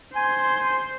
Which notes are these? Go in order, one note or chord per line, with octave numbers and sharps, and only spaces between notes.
C5 G#5 C6